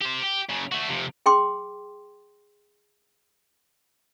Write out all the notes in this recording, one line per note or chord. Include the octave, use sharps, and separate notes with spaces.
G4 C5
G4
F#2 C#3
A3 F#4
F2 C3
G#4 G5 C6 D6